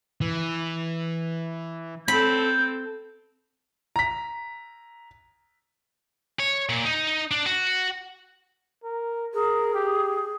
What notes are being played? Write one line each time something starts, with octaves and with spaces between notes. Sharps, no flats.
E3
C4 A4 B5 G6
A#5 B6
C#5
A#2
D#4
D4
F#4
A#4
G#4 A#4
G4